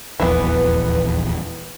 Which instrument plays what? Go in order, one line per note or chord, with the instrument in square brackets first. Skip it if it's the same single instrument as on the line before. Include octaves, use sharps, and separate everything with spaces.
[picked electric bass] D#1 A#1 E2 [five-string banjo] E3 B3 [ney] B4